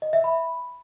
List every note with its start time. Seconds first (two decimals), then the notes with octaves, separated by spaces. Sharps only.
0.02 D#5
0.13 E5
0.24 B5